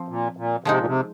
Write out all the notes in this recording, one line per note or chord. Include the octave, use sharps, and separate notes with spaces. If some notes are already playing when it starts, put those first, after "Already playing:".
Already playing: F3 C4
A#2
A#2
C3 F3 G#3 D#4
A#2
C3